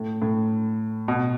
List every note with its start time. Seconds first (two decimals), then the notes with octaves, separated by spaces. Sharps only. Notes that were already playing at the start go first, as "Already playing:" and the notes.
Already playing: A2
0.22 A2
1.08 B2